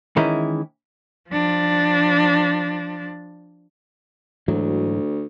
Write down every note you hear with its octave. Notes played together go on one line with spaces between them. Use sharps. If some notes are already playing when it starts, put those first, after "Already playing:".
D#3 E3 G#3 C#4 E4
F3 D4
D2 G#2 E3 F#3